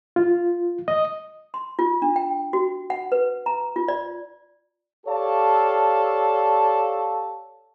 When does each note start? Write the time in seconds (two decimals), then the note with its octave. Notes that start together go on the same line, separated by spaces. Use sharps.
0.16 F4
0.88 D#5
1.54 C6
1.79 F4
2.02 D4
2.16 G5
2.53 F#4
2.90 F#5
3.12 B4
3.46 A#5
3.76 F4
3.88 D5
5.06 G4 A4 C#5 D5 F5 A5